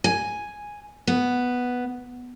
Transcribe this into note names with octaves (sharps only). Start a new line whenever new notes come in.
G#5
B3